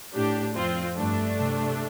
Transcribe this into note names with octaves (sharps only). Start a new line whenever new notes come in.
A2 D4 G4
F2 C4 F4
G2 A3 D4
C3